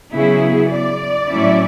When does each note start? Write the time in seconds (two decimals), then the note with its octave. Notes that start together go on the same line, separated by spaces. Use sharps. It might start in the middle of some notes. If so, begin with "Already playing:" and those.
0.15 C#3 F#3 B3 E4 G#4
0.72 D5
1.29 A2 F#3 C#4 E4